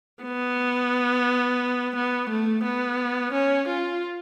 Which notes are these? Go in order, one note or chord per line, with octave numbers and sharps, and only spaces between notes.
B3
B3
A3
B3
C#4
F4